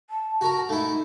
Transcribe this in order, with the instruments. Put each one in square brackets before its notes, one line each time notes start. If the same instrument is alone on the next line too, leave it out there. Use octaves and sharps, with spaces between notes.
[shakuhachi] A5
[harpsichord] F#4 A#4
[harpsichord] A3 E4 [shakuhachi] D#4